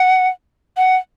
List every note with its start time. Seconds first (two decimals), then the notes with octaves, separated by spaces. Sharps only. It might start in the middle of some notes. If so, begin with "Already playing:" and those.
Already playing: F#5
0.77 F#5